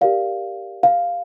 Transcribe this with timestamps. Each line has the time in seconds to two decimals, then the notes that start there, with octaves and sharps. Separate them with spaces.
0.01 G4 A#4 D5 F5
0.83 F5